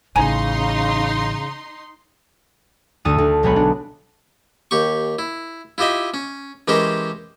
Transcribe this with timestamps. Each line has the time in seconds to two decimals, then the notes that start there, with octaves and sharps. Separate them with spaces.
0.16 A1 C#3 D#4 G#5 A#5 C6
3.05 D2 A4 D#6 D#7
3.18 D2
3.43 B1 G#3 B3 C#5 B5
3.56 D4
4.71 D#2 G4 C#6
5.19 E4
5.78 E4 F4 G4 D#5 E5
6.14 C#4
6.68 E3 G#3 C#4 G4 A#4 C5